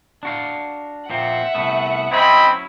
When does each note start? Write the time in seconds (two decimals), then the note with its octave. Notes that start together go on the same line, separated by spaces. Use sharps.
0.23 D4 F#4 F5
1.10 A#2 F3 C4 E5 F#5
1.55 C2 A3 B3
2.11 F#3 C4 C#4 E4 D#5 B5